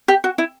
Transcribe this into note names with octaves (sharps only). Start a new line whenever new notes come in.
G4
F#4
E4